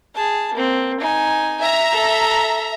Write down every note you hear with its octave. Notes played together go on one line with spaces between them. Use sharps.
G#4 A5
A#3 C4
D#4 G#5
E5 A#5
A4